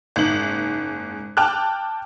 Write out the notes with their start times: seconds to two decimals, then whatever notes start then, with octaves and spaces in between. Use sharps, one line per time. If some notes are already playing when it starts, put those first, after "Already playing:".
0.16 F#1 G#2 F#7
1.37 G5 A5 D6 F6 F#6